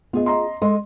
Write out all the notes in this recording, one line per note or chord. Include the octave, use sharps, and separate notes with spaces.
B3 F4 G#4 D#5
D#5 A#5 C6
G#3 A4 D#5 C6